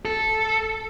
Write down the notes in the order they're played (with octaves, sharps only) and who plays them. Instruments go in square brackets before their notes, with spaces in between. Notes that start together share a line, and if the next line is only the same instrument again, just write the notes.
[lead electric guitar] A4